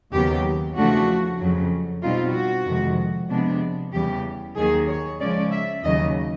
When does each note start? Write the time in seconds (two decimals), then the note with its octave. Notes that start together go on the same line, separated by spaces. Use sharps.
0.12 D#2 C#3 F#3 B3 G4
0.76 E2 C#3 F3 A3 D4 F#4
1.40 F2 C#3 F#3
2.03 B2 G3 C4 D#4 F4
2.34 F#4
2.66 F2 C3 D#3 G#3
3.30 C3 F3 G#3 B3 D4
3.93 E2 C#3 E3 G3 G4
4.57 D#2 D#3 F#3 A#3 G#4
4.88 C#5
5.20 C#3 F3 G#3 C#4 D5
5.52 E5
5.84 D#2 C#3 F#3 D#5